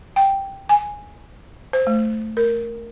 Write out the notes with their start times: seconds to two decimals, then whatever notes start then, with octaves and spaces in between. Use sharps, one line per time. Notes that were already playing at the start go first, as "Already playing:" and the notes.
0.16 G5
0.69 G#5
1.73 C5
1.87 A3
2.37 A#4